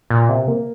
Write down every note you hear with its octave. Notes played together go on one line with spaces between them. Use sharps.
A#2
C3
A#3